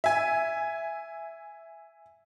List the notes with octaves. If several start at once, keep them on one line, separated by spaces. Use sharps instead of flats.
E5 G#5